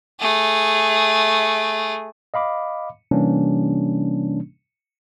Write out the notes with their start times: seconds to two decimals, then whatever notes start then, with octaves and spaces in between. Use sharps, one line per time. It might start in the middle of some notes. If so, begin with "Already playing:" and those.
0.20 A3 G#4
2.34 D#5 F5 B5 D6
3.11 C3 E3 G3 A#3 C#4 D4